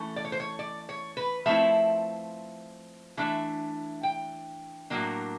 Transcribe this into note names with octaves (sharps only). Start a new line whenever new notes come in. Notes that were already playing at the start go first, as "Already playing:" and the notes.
Already playing: E3 A3 C#4
D5
C#5
C5
C#5
D5
C#5
B4
F3 A3 C4 E4 E5
E3 A3 D4 E5
G5
A2 F#3 A#3 D4